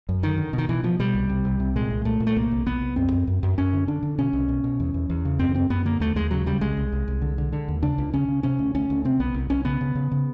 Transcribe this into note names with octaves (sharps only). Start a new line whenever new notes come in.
F#2
D3 D#3
D3
B2
D#3
B2 E3
B2 F3
B2 G3
C2
C3
C2
C3
A#2 G#3
C2
A#2 A3
A#2
A3
C2 A#3
C2
C2 B3
C2
F#2 C4
F#2
F#2
F#2
F#2 C#4
D3
D3 D4
D3
B2 C#4
C2
B2
B2
E2
E2
E2
C#3
F#2 C4
F#2 C4
F#2 B3
D3 A#3
D#2 A3
D#2 G#3
C#3 F#3
C#3 G3
C2 G#3
C2
C2
C2
D3
D3
D3
D#2
C#3 D4
C#2
C#3 C#4
C#3
C3 C#4
D2
D2 C#4
D2
C3 C4
C2 B3
C2
C2 C#4
C#3 B3
C#3
C#3
C#3